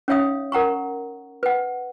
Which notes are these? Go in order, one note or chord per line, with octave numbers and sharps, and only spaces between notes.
C#4 D#4 C#5 E5 F5 D#6
A#4 F#5 A#5 C#6
B4 F#5